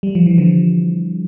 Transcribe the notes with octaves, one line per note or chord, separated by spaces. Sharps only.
G3
F3
E3
D3 F3